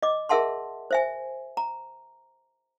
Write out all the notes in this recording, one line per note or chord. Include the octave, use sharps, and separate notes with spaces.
D#5 D6
G#4 A#4 E5 F#5 A5 C6
C5 E5 G#5
A#5